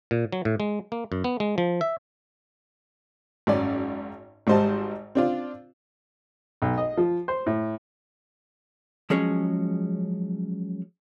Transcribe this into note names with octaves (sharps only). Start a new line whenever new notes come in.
A#2
F#3
A2
G#3
A#3
F#2
B3
G#3
F3
E5
G#1 F#2 C#4 D5
G#1 G#2 G3 C5 D#5 A5
C4 D4 F4
B1
D#5
F3
C5
A2
F3 F#3 G#3 C#4 G#4 C#5